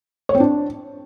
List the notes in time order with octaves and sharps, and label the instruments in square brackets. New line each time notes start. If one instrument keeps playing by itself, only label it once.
[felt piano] C#5
C4
D4